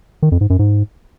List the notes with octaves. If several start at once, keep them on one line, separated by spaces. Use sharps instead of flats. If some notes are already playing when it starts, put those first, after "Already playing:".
D#3
F2
G#2
F#2
G#2